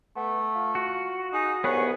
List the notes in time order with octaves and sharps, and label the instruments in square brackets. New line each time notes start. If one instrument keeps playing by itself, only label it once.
[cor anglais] A3 [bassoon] B3
[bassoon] F4
[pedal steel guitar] F#4
[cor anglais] D#4 [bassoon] G#4
[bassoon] C2 [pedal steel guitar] B3 G#4 B4 [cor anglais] C#5